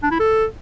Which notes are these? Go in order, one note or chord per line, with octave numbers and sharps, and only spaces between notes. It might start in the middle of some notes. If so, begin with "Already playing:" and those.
D4
E4
A4